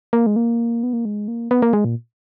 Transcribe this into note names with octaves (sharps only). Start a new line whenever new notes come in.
A#3
G#3
A#3
B3
A#3
G#3
A#3
B3
A#3
G#3
A#2